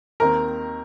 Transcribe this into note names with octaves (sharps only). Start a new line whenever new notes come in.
D#2 D#3 C4 A#4 A#5